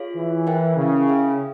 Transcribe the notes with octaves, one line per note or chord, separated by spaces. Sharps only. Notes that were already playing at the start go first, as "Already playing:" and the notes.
Already playing: F4 G#4 C#5 F5
E3
E4 A#4 E5 G5
C#3
G#4 E5 G5